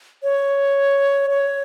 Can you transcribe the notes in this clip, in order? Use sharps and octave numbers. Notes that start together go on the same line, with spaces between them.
C#5
C#5